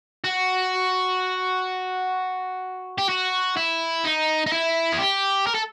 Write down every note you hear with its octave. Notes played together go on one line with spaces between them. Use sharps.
F#4
G4
F#4
E4
D#4
D#4
E4
G#4
G4
A#4
A4